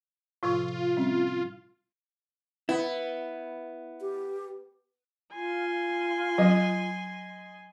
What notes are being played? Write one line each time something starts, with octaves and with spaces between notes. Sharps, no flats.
A2 C3 F3 F4
G3 C4 C#4
B3 E4
G4
F4 G#5 C6
F#3 D#5